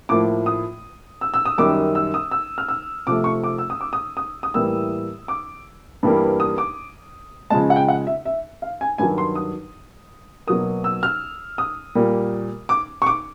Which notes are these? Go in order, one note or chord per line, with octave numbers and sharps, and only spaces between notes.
A2 F3 A#3 D6
D#6
E6
E6
D#6
F#2 D#3 G3 D6
E6
D#6
E6
F6
E6
C3 F3 A3 D6
C#6
D6
E6
D#6
D6
D#6
D#6
D#6
A2 E3 G3 A#3 E6
D6
G2 E3 G3 A#3
D#6
D6
C#3 F3 G#3 A5
F#5
G5
F#5
E5
E5
F5
G#5
G2 D#3 F#3 G#5
C6
D#6
B2 F#3 A#3 D#6
E6
F6
D#6
A#2 G3 A#3
D6
C#6
D6